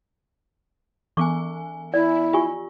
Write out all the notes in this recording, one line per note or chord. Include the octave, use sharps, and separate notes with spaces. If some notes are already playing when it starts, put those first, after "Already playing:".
E3 B3 G#5 C#6 D6
E4 D5
F4 G4 G#5 C#6